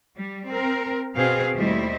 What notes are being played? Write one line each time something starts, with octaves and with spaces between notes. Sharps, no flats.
G3
C4 A#4
B2 C4 G#4 F5
D#2 G3 A3 E4 C5 D#5